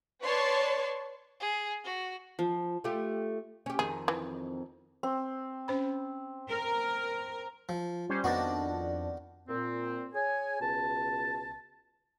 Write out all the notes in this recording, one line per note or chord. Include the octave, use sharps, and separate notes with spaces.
B4 C#5 D5 A5 C6 C#6
G#4
F#4
F3
A3 F4 G4
C#4 G4
F2 D#3 G#4
E3
C4
C#4 C5 B5
A#4
F3
G3 C#4 C5
F2 D#3 B3 D4 F#4
A#2 C4
G#4 C#5 G#5
C#2 B2 B4 A5